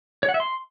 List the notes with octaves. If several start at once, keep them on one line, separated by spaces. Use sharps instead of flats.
C#5
F#5
E5
C6